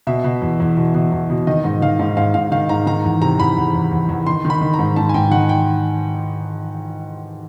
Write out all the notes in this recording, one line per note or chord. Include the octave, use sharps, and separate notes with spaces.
B2 E5
B2
E2
E2
B2
B2
E2
B2
D#3 D#5
G#2
D#3 F5
G#2
G#2 F5
G#2 F5
D#3 F5
G#2 A#5
D#3 A#5
E2
C3 A#5
E2 B5
E2
E2
E2
E2
D#3 C6
D#3
B5
D#3
A#5
G#2
G#2 A5
G#5
G#2 G5
D#3 F#5
G5